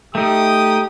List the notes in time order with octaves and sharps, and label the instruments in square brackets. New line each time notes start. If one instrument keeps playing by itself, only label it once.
[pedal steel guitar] A3 D#4 [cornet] G4 [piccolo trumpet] D#6